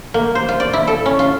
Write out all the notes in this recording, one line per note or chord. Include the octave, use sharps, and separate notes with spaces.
A#3
C5
F4
D5
E4
A4
C#4
F4